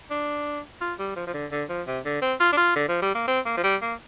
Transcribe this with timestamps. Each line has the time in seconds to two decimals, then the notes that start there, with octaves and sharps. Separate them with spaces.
0.10 D4
0.81 F4
0.99 G3
1.16 F3
1.27 F3
1.34 D3
1.52 D3
1.69 F3
1.87 C3
2.05 D3
2.22 C4
2.40 F4
2.52 D4
2.57 F4
2.76 D3
2.88 F3
3.02 G3
3.15 A#3
3.28 C4
3.46 A#3
3.57 F3
3.63 G3
3.82 A#3